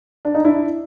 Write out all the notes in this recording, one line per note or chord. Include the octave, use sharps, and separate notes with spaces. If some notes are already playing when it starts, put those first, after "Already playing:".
D4
D#4
D4 E4